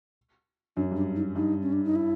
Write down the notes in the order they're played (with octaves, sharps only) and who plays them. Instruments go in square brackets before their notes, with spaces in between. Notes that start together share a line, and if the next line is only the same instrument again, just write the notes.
[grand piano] F#2 [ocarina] D4
[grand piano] G2
[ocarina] D4
D#4
[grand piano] G2 [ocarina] D#4
[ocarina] C#4
D4
D#4
E4